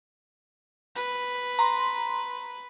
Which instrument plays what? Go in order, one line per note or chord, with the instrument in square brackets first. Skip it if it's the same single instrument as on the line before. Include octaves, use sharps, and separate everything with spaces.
[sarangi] B4
[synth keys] A#5 C6